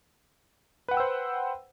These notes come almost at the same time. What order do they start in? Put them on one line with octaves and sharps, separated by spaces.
B4 F#5 G5 E6 C5